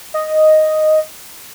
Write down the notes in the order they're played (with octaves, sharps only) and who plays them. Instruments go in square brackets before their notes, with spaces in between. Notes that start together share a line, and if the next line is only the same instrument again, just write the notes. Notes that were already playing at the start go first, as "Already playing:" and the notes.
[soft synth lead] D#5